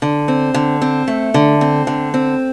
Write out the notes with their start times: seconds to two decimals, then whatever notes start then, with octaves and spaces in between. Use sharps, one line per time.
0.02 D3
0.28 C4
0.54 D3
0.82 C4
1.08 A3
1.34 D3
1.61 C4
1.87 D3
2.14 C4